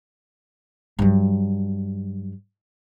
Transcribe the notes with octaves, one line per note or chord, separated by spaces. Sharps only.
G2 F#3